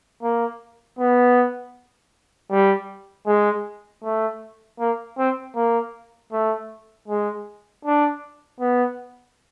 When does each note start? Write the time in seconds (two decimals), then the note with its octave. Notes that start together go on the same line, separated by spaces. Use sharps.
0.22 A#3
0.99 B3
2.51 G3
3.27 G#3
4.04 A3
4.80 A#3
5.18 C4
5.56 A#3
6.32 A3
7.08 G#3
7.85 D4
8.60 B3